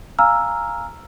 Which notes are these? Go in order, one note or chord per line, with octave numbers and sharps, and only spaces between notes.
F5 G#5 A#5 E6 F6